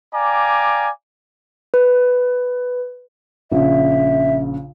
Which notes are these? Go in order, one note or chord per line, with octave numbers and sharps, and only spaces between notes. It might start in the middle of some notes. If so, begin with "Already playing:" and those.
D5 F5 G5 G#5 A#5 D6
B4
A#1 C#3 E5